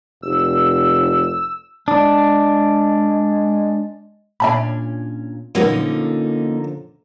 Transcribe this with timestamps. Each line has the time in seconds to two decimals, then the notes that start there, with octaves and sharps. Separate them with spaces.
0.22 F1 E6
1.88 G#3 D4
4.40 A#2 C#4 D4 E5 A5 B5
5.55 A#2 D3 F3 F#3 A#3 B3 C#4 D#4